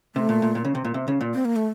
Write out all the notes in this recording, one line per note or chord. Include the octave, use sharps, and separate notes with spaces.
C3 A3
A#2
A#2
A#2
C#3
C3
A#2
C3
C#3
A#2
C4
A#3
A3